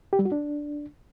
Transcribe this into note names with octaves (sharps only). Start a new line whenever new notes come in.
G4
G3
F#4
D4